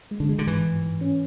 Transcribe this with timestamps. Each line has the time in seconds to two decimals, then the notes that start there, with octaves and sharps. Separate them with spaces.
0.11 G#3
0.20 D3
0.29 G#3
0.39 D3
0.47 G#2 E3
0.65 G#2
0.83 G#2
1.01 C#4